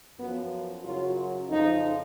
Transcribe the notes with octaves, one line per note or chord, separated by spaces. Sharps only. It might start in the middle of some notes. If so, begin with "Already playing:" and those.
F#2 F3 B3
F#2 C#3 F#3 F4
F2 C#3 F3 D#4